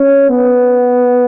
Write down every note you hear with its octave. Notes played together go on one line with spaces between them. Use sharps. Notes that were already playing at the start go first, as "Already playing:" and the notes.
Already playing: C#4
B3